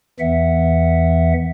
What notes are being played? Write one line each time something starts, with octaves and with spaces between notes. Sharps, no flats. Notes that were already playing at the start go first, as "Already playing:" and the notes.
E2 E3 E5 F#5